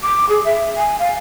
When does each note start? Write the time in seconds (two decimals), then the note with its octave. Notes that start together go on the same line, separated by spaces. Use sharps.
0.03 D6
0.29 G#4
0.44 E5
0.77 G#5
0.99 F5